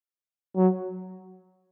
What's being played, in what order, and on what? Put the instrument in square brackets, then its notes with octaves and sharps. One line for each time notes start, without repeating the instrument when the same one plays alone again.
[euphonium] F#3